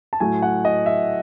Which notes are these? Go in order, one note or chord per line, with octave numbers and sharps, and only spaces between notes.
A5
A2 F#3 A3 G#5
F#5
D#5
E5